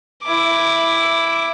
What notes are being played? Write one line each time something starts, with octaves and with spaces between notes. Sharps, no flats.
E4 D6